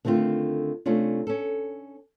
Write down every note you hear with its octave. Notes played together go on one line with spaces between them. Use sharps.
D3 D#3 A3 C4 F4
C3 A3 C#4 D4 F4
C#4 A4